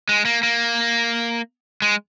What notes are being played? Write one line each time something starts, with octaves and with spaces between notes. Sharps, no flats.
G#3
A#3
A#3
G#3